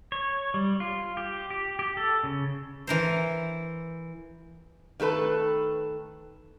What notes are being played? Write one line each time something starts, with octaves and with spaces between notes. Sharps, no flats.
C#5
G3
F4
G4
G4
G4
A4
C#3
E3 A#4 C5
D#3 A3 A4 B4